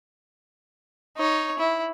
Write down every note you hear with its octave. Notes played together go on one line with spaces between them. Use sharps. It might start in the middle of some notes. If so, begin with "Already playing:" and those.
D#4 C#5
E4